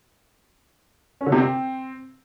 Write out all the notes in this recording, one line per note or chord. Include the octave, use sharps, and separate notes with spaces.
C#4
D3
C3
C4